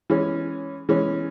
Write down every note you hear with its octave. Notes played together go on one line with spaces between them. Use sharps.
E3 G#3 C#4
E3 G#3 C#4